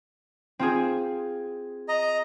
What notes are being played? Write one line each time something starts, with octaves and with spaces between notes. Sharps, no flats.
C4 F4 G#4
D#5 A#5